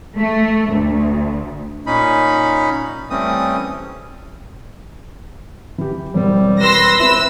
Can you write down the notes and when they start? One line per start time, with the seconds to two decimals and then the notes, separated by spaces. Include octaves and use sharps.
0.17 A3
0.72 D2
1.87 A#2 C#4 D#4 B5
3.10 E3 G3 A3 C4 C#4 D#6
5.78 E3 G4
6.14 E1 E3 G3 C4
6.61 B4 C6 E6 A#6
6.98 C4 E4 B5 E6